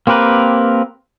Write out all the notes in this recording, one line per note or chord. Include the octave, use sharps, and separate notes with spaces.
A#3 C4 G4 A#4 B4